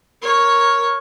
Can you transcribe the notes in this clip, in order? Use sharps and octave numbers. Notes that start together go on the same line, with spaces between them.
A#4 C#5